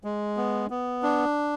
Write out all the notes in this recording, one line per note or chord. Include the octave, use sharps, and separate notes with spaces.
G#3
B3
B3
D4